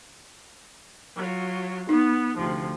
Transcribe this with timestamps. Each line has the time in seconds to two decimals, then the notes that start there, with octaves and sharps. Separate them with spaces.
1.15 F#3 F4
1.89 B3 D#4
2.37 D2 C3 F3